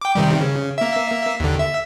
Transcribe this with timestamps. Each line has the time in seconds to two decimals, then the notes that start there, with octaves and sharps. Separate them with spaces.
0.01 G5 D6
0.15 C3 D#3 G3
0.41 C#3
0.78 A#3 E5
1.40 D#2 D3
1.59 E5